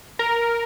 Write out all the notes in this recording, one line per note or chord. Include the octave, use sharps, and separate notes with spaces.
A#4